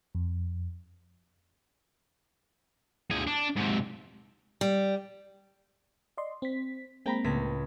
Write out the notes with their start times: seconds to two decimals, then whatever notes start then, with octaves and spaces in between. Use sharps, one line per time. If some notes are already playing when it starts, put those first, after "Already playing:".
0.15 F2
3.10 D2 G#4
3.27 D4
3.56 G#2 C3
4.61 G3
6.18 D5 D#5 C6
6.42 C4 B6
7.06 G#3 A#3 C4 G5 A#5 B5
7.24 C#2 A2 B6